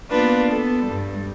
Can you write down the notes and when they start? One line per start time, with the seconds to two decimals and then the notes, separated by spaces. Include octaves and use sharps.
0.11 A#3 B3 D4 F4 B4
0.51 B3 A4
0.87 G2 G3